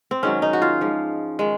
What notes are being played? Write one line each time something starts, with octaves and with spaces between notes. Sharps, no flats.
C4
G#2 D#3 F#3 C#4
D#4
F#4
F4
G#2 F3
D#3 G#3